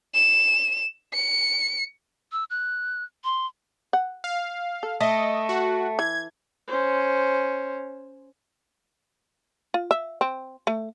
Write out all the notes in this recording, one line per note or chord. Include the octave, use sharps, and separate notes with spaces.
E7
C#7
E6
F#6
C6
F#5
F5
A4
A3 D#5
F#4
E3 G#6
C#4 C5
F4
E5
C4
A3